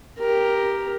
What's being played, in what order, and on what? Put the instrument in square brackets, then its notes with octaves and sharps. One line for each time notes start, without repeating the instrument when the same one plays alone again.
[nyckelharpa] G4 A#4